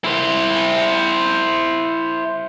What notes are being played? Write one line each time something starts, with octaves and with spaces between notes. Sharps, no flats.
E4 C5